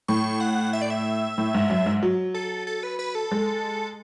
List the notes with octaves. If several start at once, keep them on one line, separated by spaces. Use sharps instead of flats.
A2 C#6
F#5
E5
D5
E5
A2
G#2
F#2
G#2
F#3
A4
A4
B4
B4
A4
G#3